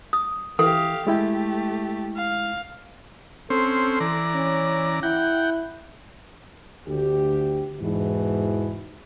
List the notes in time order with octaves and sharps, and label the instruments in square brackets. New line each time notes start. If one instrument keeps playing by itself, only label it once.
[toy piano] D#6
[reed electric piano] E3 [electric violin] G4 F5 [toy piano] A4
[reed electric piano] G#3 E4 G5 [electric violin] A3 G4
[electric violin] F5
[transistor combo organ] C4 C#4 C5 [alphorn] A4
[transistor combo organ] E3 D5 A#5
[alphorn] C#4
[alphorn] E4 [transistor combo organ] F#5 G5
[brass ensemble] D2 G4
E2 G#2 B2 E3